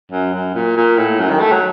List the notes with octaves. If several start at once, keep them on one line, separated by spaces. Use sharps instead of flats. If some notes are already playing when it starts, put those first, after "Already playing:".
F#2
F#2
A#2
A#2
A2
F#2
D#3
A3
F#3